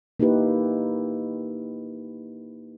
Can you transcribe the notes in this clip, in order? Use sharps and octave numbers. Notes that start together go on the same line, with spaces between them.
A#3 D#4 E4 G4 B4